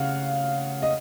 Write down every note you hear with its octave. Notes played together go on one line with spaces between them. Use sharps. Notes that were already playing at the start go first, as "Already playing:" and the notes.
Already playing: C#3 F5 F#5
D#5